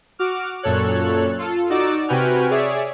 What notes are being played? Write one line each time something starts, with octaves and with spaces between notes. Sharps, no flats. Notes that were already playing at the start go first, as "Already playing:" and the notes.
F#4 D6 F6
F#2 A#2 A4 C#5 F#6
F4 A4
D#4 F#4 D5 D6 E6 A6
C3 F#4 B4 G5 G#5 F6
G#4 C#5 D5 E5